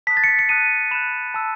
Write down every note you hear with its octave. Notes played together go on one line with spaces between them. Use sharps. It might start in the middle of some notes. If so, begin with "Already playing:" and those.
A5 D#6 F#6 B6
A6
C#7
B6
C#7
A5 D#6 F#6 D#7
B5 F#6 E7
A5 E6